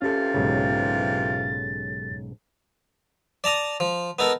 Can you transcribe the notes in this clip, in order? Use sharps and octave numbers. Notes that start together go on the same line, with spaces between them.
C3 E3 C#4 F4 G4 A4 A6
B1 G#2 C#3
D5 A5 A#5 D#6
F3
B3 D#4 A4 A#4